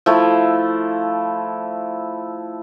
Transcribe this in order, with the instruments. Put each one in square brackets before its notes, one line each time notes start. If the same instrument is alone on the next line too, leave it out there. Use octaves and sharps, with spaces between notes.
[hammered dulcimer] F3 A3 E4